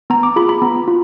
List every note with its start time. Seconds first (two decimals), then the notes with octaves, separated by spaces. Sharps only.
0.10 B3 A#5
0.23 D6
0.36 F4 G#4 B5
0.49 B5
0.62 B3 A#5
0.88 F4